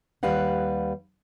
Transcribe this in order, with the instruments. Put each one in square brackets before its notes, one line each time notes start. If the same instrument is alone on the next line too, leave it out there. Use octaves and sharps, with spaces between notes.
[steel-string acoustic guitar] D#2 G3 B4 F5 F#5